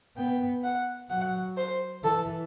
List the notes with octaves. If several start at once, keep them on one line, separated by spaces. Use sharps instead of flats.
B3 G5
F#5
F#3 F#5
C5
E3 A4